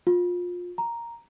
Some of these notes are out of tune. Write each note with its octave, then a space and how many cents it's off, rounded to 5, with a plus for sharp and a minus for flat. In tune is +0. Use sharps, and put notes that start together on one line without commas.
F4 +25
A#5 +0